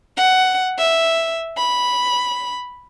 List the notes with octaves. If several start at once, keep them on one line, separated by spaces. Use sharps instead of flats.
F#5
E5
B5